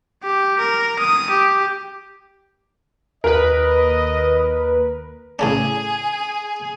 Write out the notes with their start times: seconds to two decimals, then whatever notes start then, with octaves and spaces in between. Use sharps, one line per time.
0.23 G4
0.59 A#4
0.99 D#6
1.30 G4
3.24 D#2 A#4 B4 D#5
5.39 A2 C#3 D4 G#4 G#5